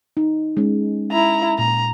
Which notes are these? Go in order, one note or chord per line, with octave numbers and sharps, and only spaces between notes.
D#4
G#3 C#4
E4 A#5
A#2 A#5